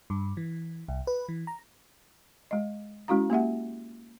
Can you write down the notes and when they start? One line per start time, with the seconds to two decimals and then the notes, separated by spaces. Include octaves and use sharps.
0.10 G2
0.37 E3
0.88 C2
1.07 B4
1.29 E3
1.47 A#5
2.51 G#3 D#5
3.08 G#3 C#4 E4 F#4 F5 A#5
3.30 A#3 G4 E5 F#5